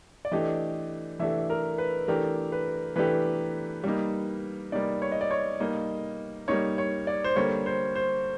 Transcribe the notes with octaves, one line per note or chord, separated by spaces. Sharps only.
D5
E3 A3 D4 G4 D#5
E3 A3 D4 G4 E5
A#4
B4
E3 A3 D4 G4 A#4
B4
E3 A3 D4 G4 B4
G3 A#3 D#4
G3 A#3 D#4 D5
C#5
D#5
D5
C#5
G3 A#3 D#4 D#5
G3 A#3 D#4 C#5
C#5
D5
C5
D3 G3 A#3 C#5
C5
C5